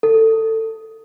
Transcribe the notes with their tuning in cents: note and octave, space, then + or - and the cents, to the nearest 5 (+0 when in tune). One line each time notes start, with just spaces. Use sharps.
A4 +20